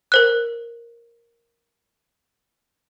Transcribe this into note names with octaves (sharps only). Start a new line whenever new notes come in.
A#4 C5 F#6